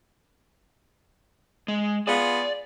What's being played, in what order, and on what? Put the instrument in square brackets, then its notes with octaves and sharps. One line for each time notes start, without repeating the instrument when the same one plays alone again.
[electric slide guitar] G#3
[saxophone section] B3 F4 G#4 [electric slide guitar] D5